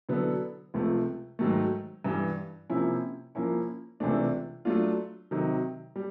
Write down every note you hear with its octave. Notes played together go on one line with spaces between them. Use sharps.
D3 F#3 B3 E4 A4
C#2 C3 F3 A3
G#2 D#3 F#3 A3
G2 E3 G3
C3 F3 A#3 C#4 E4
F3 A#3 C#4 E4
C#2 C3 E3 A3 D4
F#3 A3 D4 F4
C3 D#3 F#3
G3